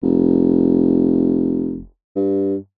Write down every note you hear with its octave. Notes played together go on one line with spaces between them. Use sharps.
F1
G2